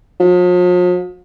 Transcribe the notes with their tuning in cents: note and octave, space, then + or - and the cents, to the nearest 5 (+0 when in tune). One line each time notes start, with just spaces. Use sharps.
F3 +45